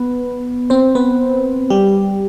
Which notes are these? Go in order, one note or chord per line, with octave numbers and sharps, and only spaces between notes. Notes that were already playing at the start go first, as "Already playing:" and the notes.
Already playing: B3 B4
C4 C5
B3 B4
G3 G4